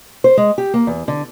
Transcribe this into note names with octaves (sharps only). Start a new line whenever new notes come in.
C5
G#3
G4
A#3
E2
D3